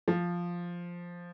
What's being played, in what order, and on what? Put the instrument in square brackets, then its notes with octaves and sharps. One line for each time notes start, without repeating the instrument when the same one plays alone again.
[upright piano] F3